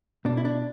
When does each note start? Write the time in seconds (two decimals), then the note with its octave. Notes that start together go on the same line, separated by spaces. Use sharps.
0.25 B2 D4
0.37 E4
0.45 D4